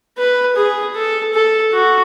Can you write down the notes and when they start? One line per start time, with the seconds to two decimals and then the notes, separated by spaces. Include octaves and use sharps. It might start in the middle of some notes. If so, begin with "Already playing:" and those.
0.17 B4
0.56 G#4
0.95 A4
1.34 A4
1.73 F#4